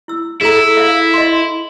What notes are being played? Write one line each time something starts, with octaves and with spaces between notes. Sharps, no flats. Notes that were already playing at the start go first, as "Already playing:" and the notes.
E4 E6
E4 G#4 A4 A#5
E5 F5
D#5 C6